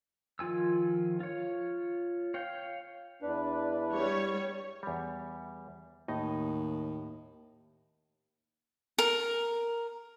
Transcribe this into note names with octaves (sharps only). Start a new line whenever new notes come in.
D#3 F3 F4 G#5 E6
F4 C#5
C#5 F5 G5
E2 D4 B4
G3 C#5
E2 G3
D#2 A2 D#4 D#5
A#4